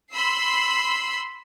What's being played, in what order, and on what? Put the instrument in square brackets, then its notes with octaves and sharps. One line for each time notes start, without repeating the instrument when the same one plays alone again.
[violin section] B5 C6 E6 C7